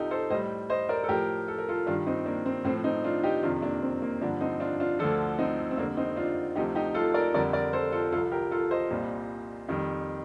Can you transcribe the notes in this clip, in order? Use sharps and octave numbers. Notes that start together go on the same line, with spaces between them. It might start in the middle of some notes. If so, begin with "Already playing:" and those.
Already playing: C2 C3 G3 D#4 F4 G4 A4
A4 C5
A2 G3 C5 D#5
C5 D#5
A#4 D5
A4
A2 F3 G4 A#4
A4
A#4
F4 A4
G2 D#3 G3 D4 F4
C4 D#4
A#3 D4
C4
A2 F3 C4
C4 D#4
D4 F4
D#4 G4
F2 C3 D#3 D4 F4
A#3 D4
C4
A#3
G2 D3 F3 A#3 D4
C4 D#4
D4 F4
D4 F4
D2 D3 F3 F4 A4
C4 D#4
C4
F2 D3 G3 A#3 D4
C4 D#4
D4 F4
D2 C3 F3 D#4 G4
D#4 G4
F4 A4
A#4 D5
F2 D3 G3 A#4 D5
A#4 D5
A4 C5
F4 A4
C2 C3 F3 F4 A4
G4 A#4
F4 A4
C5 D#5
C2 A#2 G3
F2 D#3 G3